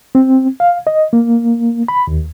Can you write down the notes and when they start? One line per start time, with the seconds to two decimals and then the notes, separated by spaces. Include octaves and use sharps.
0.15 C4
0.60 F5
0.87 D#5
1.13 A#3
1.88 B5
2.07 D#2